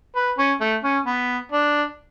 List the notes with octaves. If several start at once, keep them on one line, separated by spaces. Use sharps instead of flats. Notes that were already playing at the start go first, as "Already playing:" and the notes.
B4
C#4
A3
C#4
B3
D4